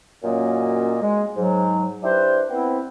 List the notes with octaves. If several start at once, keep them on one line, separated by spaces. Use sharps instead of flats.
F#2 A#2 F#3 A#3 C#4 D#5
G#3
G#2 F#3
D4 E4 G4 B4 C5
B3 C4 E4